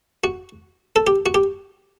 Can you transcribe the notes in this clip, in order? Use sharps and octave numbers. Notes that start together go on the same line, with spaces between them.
F#4
A4
G4
F#4
G4